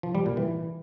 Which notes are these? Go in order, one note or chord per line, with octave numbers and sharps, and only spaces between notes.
F3
G3
A#2
E3